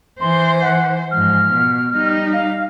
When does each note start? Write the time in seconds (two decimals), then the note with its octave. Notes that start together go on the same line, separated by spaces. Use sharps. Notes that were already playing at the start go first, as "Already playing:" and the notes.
0.21 E3 C5 C6
0.61 F#5
1.11 G#2 F3 F6
1.53 B2
1.94 G3 D#4
2.33 F5